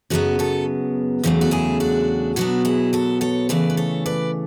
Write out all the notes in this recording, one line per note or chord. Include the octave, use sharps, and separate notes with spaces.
F#2 C#3 F#3 B3 F#4 A4
F#4 A4
E2 C#3 F#3 A3
F#4
E4 G#4
D4 F#4
B2 F#3 B3 D4 F#4
E4 G#4
F#4 A4
A4 C#5
C#3 E3 A3 B4 D5
B4
A4 C#5
B4 D5